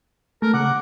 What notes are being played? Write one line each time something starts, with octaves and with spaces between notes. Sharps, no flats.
A3 A#4
C#3 F#5 D6